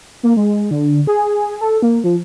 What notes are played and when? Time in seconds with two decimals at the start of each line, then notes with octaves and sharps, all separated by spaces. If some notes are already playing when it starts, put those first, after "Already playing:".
0.23 A#3
0.37 G#3
0.71 D3
1.07 G#4
1.61 A4
1.82 A#3
2.04 F3